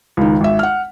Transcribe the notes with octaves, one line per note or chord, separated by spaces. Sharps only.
C#2 D#3
G#1 E5
F#5 F6